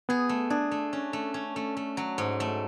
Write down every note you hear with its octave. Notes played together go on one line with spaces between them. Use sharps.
B3 G#4
A3
D4 G#4
A3
C#4
A3
C#4
A3
A3
F#3
G#2
A3